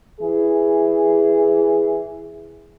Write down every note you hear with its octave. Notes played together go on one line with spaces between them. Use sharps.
E3 E4 G#4